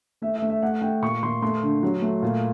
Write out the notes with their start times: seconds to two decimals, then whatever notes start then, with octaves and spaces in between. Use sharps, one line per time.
0.22 A3 E5
0.36 E5
0.42 A3
0.50 E5
0.62 A3 F#5
0.82 A3 G5
1.02 A#2 C#6
1.23 A#2 C6
1.42 A3 C6
1.63 D3
1.83 F#3
2.02 A3
2.22 A#2